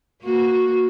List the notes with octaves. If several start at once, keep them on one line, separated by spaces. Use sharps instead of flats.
A#3 F#4